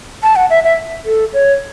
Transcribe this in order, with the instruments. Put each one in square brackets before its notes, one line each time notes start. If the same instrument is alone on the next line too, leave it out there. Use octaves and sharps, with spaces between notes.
[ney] A5
F#5
E5
E5
A4
C#5